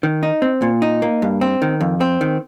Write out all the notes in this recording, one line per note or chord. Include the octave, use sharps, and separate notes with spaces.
D#3
D#4
C4
A#2
D#4
A#3
G2
C4
D#3
F2
C4
D#3